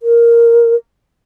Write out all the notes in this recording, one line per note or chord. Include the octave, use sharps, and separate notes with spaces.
A#4